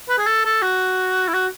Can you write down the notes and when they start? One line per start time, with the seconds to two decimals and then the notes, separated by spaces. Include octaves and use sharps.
0.09 B4
0.18 G#4
0.26 A4
0.45 A4
0.62 F#4
1.28 E4
1.34 F#4